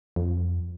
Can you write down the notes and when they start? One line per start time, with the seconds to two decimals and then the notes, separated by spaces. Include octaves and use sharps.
0.16 F2